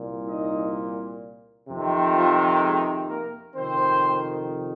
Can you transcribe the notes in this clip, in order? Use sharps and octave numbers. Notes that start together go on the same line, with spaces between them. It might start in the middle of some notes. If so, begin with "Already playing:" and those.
Already playing: C2 A#2
D#4 D#5
F2 C3 D#3
F3 F4
G#3 G#4
A#3 A#4
F2 C3 D#3 C4 C5